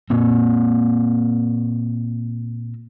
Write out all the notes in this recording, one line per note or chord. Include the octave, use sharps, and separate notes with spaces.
A#2 A#3 C4